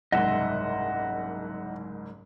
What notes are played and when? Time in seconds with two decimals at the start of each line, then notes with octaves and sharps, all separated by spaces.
0.12 F#1 C2 G#2 D#5 E5 F#5 C6